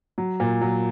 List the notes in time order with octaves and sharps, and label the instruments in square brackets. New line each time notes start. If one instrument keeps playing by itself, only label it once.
[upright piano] F#3
A#2
F#3